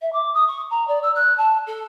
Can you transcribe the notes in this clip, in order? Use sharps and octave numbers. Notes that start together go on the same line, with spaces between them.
E5
D6
D#6
C#6
A#5
D5
E6
F#6
A5
A4